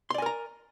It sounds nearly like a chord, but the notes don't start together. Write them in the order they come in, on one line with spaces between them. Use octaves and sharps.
C6 D5 G#5 A#4 A#5